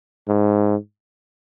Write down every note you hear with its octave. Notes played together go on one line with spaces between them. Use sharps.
G#2